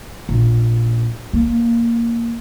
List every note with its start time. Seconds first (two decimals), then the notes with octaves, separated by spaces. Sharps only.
0.29 A#1
1.33 A#3